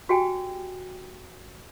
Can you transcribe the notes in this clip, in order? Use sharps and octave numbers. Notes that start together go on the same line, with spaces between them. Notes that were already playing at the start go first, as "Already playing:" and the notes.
F#4 G4 G5 G#5